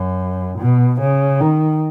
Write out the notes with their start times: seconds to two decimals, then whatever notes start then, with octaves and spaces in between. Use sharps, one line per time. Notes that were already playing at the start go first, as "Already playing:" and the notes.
Already playing: F#2
0.60 B2
1.01 C#3
1.41 D#3